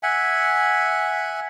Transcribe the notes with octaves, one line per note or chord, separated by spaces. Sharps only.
E5 F#5 G#5